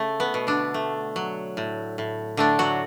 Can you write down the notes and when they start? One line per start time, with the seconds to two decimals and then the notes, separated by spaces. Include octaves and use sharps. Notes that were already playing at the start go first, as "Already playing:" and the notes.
Already playing: C#3 A3
0.20 B3
0.34 B2
0.47 D3 D4
0.74 A3
1.16 F#3
1.57 A2
1.98 A2
2.37 D3 A3 D4
2.59 F#3 F#4